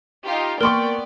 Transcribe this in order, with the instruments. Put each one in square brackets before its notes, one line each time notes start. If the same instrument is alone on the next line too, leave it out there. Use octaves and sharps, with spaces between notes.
[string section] D#4 F4 G4
[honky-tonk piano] A#3 C#6 [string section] B3 D5 G5 [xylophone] A#4 C6